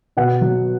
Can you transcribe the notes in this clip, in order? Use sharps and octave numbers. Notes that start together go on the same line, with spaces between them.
B2 F#5
F#3